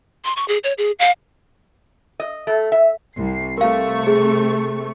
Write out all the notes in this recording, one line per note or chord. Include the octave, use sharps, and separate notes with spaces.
C6
C#6
G#4
C#5
G#4
F5
D#5
A3
E5
C2 C7
C3 A3 A#4 F5 C#6
G#4